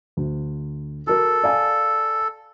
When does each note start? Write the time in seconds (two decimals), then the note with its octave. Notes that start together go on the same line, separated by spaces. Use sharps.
0.17 D2
1.07 F#4 A4 A#4
1.44 D5 F5 G#5